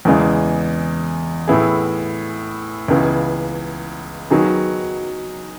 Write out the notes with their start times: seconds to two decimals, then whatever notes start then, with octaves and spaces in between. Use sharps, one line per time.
0.05 E2 C#3 E3 G#3
1.47 A2 E3 B3 E4 G#4
2.88 C#2 C#3 E3 B3
4.30 D#3 F#3 B3 D#4 G#4